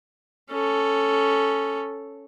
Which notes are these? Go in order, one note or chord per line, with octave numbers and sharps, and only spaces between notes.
C#4 A4